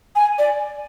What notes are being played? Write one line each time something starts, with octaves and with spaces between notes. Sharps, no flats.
G#5
D5